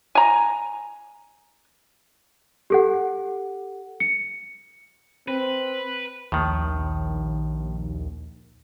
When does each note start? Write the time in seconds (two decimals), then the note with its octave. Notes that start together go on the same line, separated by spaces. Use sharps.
0.15 G#5 A#5
2.70 G4 A4 F#5
4.00 C#7
5.28 C4 B4
6.32 A#1 D#2 A2 D#3